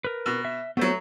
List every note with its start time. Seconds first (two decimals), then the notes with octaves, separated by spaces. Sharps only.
0.04 A#4 B4
0.26 B2
0.45 E5
0.77 F#3 A3 B3 C5